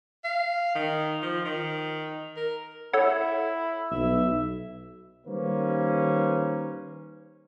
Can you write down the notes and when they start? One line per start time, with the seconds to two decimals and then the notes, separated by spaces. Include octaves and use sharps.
0.24 F5
0.75 D#3
1.23 F3
1.45 D#3
2.37 A#4
2.94 E4 A4 C#5 F#5
3.91 B1 E5
5.25 D#3 G3 A#3 C#4 B4 C5